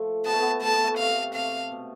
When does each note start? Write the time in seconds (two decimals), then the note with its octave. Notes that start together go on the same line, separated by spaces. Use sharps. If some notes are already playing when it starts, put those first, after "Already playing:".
Already playing: F3 A3
0.25 B3 A5
0.33 A3
0.40 B3
0.62 A3 A5
0.73 B3
0.84 A3
0.98 C3 F5
1.35 C3 F5
1.72 B2